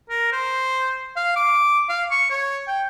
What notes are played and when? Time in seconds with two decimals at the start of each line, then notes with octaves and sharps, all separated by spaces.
0.10 A#4
0.32 C5
1.16 F5
1.36 D6
1.89 F5
2.11 C#6
2.31 C#5
2.68 G5